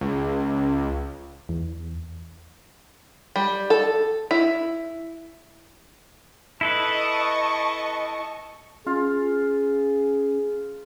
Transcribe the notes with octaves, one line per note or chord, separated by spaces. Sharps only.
C#2
E2
G3
A4
E4
E4 A4 B4 D#5 A5 C#6
C#4 F4 G#4